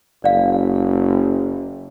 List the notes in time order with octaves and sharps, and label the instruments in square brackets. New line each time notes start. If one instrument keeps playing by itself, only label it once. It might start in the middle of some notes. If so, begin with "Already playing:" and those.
[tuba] F#1 [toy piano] D5 F5